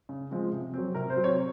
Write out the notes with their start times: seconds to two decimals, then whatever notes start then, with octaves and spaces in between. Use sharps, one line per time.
0.09 C#3
0.31 F3 G#3 C4
0.52 C3
0.74 F#3 C4
0.95 C3 A#4
1.10 C5
1.16 F#3 C4
1.24 C#5